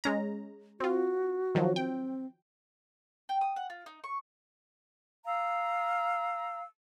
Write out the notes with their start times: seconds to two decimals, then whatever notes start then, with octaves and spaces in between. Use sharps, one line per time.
0.04 G#3 C#4 A#5
0.80 C4 F4 F#4
1.55 D#3 F3 F#3
1.76 C4 G5
3.29 G5
3.41 D#6
3.56 F#5
3.70 F4
3.86 D#4
4.04 C#6
5.25 F5 A#5 E6